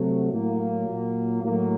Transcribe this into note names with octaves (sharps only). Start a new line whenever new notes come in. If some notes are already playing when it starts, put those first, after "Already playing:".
Already playing: C3 F#3 A3
A2 F#3 A#3
A#2 F#3
A2 F#3 A#3